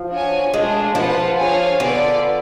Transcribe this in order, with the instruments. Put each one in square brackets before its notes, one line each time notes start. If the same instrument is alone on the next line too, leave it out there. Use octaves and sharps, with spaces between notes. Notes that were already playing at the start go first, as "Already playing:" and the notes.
Already playing: [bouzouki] F3
[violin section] D4 F#4 C#5 G#5
[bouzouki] G#3 [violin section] A3 D4 F4 G#4
[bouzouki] F3 [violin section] F4 B4 F#5 A5
[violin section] D4 G#4 C#5 F5 G#5
[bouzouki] D3 [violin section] B3 F4 B4 D5